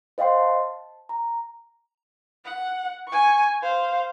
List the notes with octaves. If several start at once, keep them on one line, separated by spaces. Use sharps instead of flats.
C5 D#5 F5 G5 C6 C7
A5
A#5
F#5
G#5 C#6
C5 F5